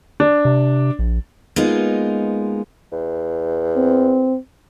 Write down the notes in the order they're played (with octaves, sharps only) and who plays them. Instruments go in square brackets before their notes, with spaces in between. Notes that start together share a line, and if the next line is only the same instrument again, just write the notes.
[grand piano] D4
[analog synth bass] C3
A#1
[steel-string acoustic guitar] G#3 A#3 B3 D#4 F4
[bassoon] E2
[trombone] C4